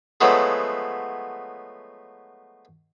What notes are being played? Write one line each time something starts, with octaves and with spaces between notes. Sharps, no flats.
F3 F#3 G#3 A3 B3